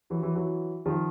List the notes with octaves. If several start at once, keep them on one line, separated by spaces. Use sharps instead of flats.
E3 F#3
E3 F#3
E3 F#3
D#3 F3